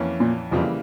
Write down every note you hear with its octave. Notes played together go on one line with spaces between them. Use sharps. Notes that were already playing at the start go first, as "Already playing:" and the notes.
Already playing: F2 E3 A#3 C#4
A#2
F2 C#3 E3 F3 G3 A#3